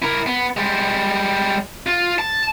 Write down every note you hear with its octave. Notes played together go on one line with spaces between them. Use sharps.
E4 A#4
B3
G3 G#3
F4
A5